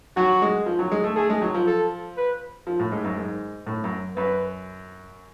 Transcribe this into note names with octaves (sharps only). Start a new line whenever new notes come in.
F#3 F#4
G#3
F3
F#3
G#3
A3
A3 G#4
G#3
F#3
F3
A4
B4
F3
A2
G#2
F#2
G#2
A2
F#2
F#2 B4